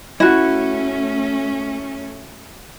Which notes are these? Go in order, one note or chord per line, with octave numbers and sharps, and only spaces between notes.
A3 C#4 E4 F#4